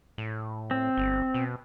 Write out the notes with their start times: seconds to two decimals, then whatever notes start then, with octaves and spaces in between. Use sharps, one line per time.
0.18 A2
0.71 C4
0.97 G1
1.34 B2